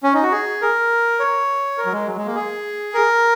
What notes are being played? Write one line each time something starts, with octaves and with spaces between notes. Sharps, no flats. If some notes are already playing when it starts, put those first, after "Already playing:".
C#4
D#4
F#4
G#4
A#4
C#5
A#4
F#3
G#3
F#3
G#3
A#3
G#4
A#4